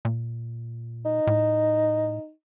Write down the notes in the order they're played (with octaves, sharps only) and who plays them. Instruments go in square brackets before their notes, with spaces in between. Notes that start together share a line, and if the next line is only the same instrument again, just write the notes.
[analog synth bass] A#2
[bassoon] D#4
[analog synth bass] A2